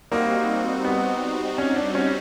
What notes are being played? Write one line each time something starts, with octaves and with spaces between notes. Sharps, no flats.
G3 A#3 C4 D#4 F#4
B3
C#4
D4
C#4